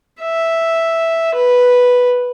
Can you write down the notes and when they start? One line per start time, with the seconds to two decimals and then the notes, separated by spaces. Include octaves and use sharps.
0.21 E5
1.35 B4